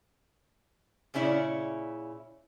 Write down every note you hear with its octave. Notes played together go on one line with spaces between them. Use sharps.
A#2 C#3 C#4 E4 D5